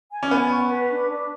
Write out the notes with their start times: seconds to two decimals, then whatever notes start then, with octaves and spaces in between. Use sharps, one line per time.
0.11 G#5
0.23 C#4
0.30 B3 G#5
0.51 C#6
0.70 B4
0.90 D4
1.09 D4